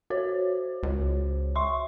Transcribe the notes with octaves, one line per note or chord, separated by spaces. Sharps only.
F#4 C5 C#5
C#2
E5 C6 C#6